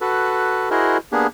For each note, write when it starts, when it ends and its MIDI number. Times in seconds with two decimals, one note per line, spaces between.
0.01 0.69 66
0.01 0.69 69
0.01 0.69 71
0.71 0.97 64
0.71 0.97 66
0.71 0.97 68
0.71 0.97 70
0.71 0.97 72
0.71 0.97 75
1.12 1.27 58
1.12 1.27 59
1.12 1.27 62
1.12 1.27 67
1.12 1.27 68